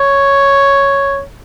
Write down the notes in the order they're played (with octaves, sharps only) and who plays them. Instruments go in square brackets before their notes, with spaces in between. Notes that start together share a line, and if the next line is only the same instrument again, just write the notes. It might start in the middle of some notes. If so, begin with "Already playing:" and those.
Already playing: [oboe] C#5